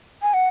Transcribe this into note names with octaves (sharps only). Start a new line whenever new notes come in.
G#5
F#5